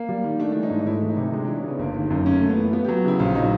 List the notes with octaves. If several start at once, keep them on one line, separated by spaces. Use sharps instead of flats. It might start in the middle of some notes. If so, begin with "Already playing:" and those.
Already playing: A#3
G3
D#3
A3 D4
E3 D4
D#4
G#2
D#4
A3 E4
E3
D#4
C3
G#3 D4
D4
E3
C#4
C#3 B3
G1 A#3
D#3
A#3
F#2
A3 C#4
A#3
A3
B3
E3 E4
B3 F4
G4
F#3
F#4
C#3 E4
A#1 F4
F#3 D#4